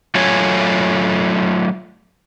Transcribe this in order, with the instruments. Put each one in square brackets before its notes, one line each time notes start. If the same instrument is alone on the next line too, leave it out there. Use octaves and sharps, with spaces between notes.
[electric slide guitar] F#3 A3 F4 A4 C#5 G#5